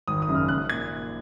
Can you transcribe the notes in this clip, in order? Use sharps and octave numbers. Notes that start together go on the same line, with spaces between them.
G#1 D#6
D#6
F#2 C#3
F6
A#1 F#6
A#2 G#6